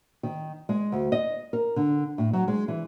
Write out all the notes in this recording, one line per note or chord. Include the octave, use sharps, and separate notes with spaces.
D#3
G#3
D2
D#5
A#4
D3
A2
F#3
G#3
E3